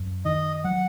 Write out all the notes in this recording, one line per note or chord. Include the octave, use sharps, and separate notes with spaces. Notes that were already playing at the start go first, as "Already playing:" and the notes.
Already playing: F#2
D#3 D#5
F#3 F#5